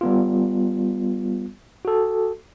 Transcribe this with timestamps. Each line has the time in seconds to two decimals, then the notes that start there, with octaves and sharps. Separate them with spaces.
0.01 G3 B3 F4
1.85 F#4 A4